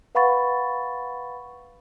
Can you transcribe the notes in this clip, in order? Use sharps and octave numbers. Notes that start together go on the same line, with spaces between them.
B4 F5 F#5 B5 C#6 A6